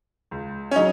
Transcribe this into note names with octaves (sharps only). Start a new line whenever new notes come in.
C#2
C#4
C#3 F#3 D#4